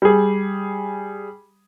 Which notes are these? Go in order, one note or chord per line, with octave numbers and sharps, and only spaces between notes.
G3 G#4